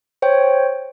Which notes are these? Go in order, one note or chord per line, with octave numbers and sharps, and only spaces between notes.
C5 C#5 G5